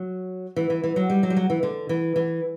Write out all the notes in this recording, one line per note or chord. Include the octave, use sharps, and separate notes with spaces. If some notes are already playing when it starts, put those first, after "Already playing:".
Already playing: F#3
E3
E3
E3
F#3
G3
F#3
G3
F#3
E3
D3
E3
E3